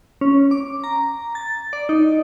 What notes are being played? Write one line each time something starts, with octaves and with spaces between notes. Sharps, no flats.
C#4
D6
A#5
A6
D5
D#4